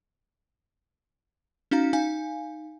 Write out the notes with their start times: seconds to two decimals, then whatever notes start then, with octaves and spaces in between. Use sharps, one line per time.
1.71 C#4 D#4 F#4 F5 A#5
1.93 D#4 F5 G#5